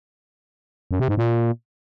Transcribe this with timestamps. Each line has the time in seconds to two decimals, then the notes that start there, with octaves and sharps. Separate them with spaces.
0.91 F#2
1.00 C3
1.08 G#2
1.17 A#2